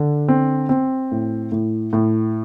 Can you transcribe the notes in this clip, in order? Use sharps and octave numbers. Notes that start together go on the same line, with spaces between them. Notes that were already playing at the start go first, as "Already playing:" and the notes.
Already playing: D3
C4
C4
A2
A2
A2